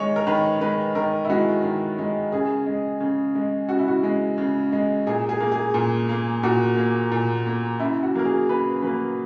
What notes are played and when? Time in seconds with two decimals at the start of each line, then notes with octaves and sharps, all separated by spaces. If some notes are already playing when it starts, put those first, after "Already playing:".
Already playing: D#3 G#3 C#5
0.16 A#4
0.27 D#3 B4
0.61 G#3 B4
0.95 D#3 A#4
1.25 E4
1.29 G#3 F#4
1.63 D#3
1.98 G#3
2.32 C#3 G#4
2.66 G#3
3.00 C#3
3.35 G#3
3.69 C#3 F#4
3.79 E4
3.88 F#4
4.03 G#3
4.38 C#3
4.72 G#3
5.07 A#2 G#4
5.29 G#4
5.40 A#3
5.52 G#4
5.74 A#2
6.09 A#3
6.43 A#2 F#4
6.77 A#3
7.12 A#2
7.46 A#3
7.80 C#3 E4
8.03 F#4
8.15 F#3 A#3 A#4
8.25 G#4
8.49 C#3 B4
8.83 F#3 A#3 B4